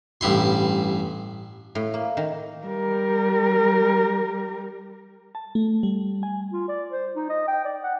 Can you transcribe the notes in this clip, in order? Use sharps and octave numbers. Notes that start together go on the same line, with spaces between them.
A1 G2 E4 C6
A2
A#3
D#3
G3 A#4
A5
A3
G3
G#5
F4
D5
C5
D#4
D#5
G5
D5
F#5